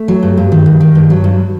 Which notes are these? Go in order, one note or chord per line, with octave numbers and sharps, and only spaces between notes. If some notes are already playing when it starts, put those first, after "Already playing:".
Already playing: A3
F#3
G2
G2
D#3
G2
D#3
G2
F#3
G2